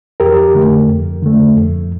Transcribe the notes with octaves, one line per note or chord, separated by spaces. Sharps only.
F2 G4 A#4
D3 A3
F2
D3 A3
F2